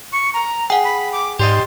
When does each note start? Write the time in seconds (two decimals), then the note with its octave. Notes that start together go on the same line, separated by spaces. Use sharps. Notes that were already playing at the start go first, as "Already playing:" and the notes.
0.12 C#6
0.34 A#5
0.70 G#4 F#5 G5
0.84 B5
1.12 D6
1.39 G#2 G4 D5 D#5 C6